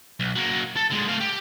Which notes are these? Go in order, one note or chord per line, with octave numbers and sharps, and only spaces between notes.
B1
F#3 A#3
A4
D3 G#3
A3 F5
G4